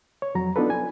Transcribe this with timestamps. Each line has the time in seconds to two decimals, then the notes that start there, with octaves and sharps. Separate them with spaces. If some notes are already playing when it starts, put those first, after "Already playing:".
0.22 C#5
0.35 F2 F#3 A#5
0.56 B3 D4 D#4 F4 A4 B4
0.70 G#5